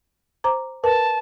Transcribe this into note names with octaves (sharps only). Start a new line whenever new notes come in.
C5 A#5 D6
A#4 B4 A5